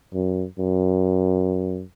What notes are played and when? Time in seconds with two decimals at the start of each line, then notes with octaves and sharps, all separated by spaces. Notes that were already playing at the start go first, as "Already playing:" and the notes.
0.14 F#2
0.59 F#2